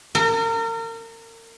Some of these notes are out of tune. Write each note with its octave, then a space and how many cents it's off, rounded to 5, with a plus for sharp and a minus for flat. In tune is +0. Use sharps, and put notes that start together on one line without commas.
A#4 -35